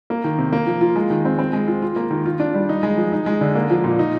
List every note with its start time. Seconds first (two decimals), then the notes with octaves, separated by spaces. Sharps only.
0.10 A#3
0.24 D#3
0.38 C3
0.53 A#3
0.67 F3
0.81 F4
0.96 G#3
1.10 D#3
1.25 C4
1.39 C4
1.53 G#3
1.68 F4
1.82 F4
1.96 A#3
2.11 D#3
2.26 F4
2.40 D4
2.54 G3
2.69 D#4
2.83 G#3
2.97 F3
3.13 D#4
3.26 G#3
3.41 D3
3.55 A#3
3.70 F3
3.84 A#2
3.99 D#4